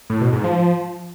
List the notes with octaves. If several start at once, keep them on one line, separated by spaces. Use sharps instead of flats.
A2
B2
G#2
F3